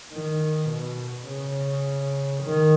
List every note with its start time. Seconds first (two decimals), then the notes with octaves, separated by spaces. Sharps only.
0.13 D#3
0.70 B2
1.28 C#3
2.44 D#3